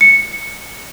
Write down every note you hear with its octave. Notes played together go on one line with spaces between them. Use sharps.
C#7